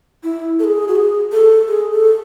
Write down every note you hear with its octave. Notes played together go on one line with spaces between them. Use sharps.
E4
A4
G#4
F#4
G#4
A4
G#4
A4